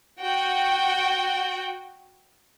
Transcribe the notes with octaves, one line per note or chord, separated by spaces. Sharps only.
F#4 G5